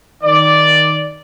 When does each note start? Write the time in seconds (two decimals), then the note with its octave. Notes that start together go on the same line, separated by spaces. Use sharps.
0.24 D#3 D5